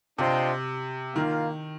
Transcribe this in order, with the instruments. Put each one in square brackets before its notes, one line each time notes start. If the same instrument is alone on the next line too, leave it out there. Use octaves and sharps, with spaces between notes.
[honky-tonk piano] C3 [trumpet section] D4 F4 C5 D#5 G5
[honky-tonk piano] D#3 [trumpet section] A#3 F4 A#4 F5